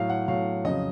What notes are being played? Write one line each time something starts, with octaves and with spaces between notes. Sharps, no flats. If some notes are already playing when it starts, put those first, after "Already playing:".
Already playing: A2 F#3 F5
F#5
A2 F#3 F5
F2 C#3 F#3 D#5